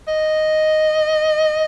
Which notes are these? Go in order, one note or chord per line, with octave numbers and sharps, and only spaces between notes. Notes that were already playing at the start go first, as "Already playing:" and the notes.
D#5